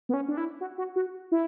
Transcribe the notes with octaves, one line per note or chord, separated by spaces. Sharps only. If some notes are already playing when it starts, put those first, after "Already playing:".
B3
C#4
D4
E4
F#4
F#4
F#4
E4